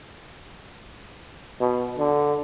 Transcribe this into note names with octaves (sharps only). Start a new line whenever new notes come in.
B2
D3